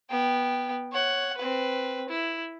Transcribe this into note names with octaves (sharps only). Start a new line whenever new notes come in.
B3 G5
C#5 F#5
C4 B4
E4